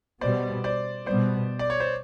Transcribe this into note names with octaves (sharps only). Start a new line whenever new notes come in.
B2 G3 B3 C5 D5
C5 D5
B2 G3 B3 C5 D5
D5
C#5
C5